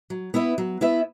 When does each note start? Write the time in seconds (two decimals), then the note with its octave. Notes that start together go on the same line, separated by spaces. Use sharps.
0.10 F#3
0.34 B3 E4 B4 E5
0.58 F#3
0.81 B3 E4 B4 E5